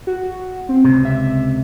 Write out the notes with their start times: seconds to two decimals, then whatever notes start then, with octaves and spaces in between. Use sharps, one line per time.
0.07 F#4
0.69 C4
0.84 C#2 C3
1.05 E5